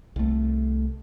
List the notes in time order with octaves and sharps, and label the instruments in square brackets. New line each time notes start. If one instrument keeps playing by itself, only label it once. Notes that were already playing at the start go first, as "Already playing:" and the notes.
[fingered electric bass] C2 A3